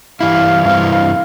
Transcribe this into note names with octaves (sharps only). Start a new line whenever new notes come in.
G2 E3 G3 E4 F5
G2 E3 G3 C4 E4 F5